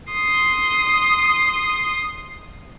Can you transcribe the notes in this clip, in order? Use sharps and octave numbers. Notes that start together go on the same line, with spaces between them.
C6 D#6